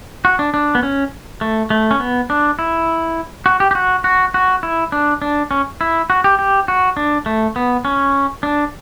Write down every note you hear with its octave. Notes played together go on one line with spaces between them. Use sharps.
F#4
D4
D4
B3
C#4
A3
A3
C#4
B3
D4
E4
F#4
G4
G4
F#4
F#4
F#4
E4
D4
D4
C#4
E4
F#4
G4
G4
F#4
D4
A3
B3
C#4
D4